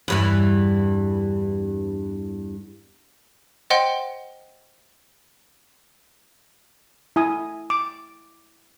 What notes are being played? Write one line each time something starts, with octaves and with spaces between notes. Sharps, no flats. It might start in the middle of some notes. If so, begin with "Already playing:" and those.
E2 G2 E3
C5 D#5 F#5 G5 C6
E4 G#5 D#6
D6